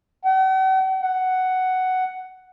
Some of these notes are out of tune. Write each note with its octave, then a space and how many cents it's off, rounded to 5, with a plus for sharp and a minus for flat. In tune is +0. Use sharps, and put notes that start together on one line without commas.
F#5 +45
F#5 +5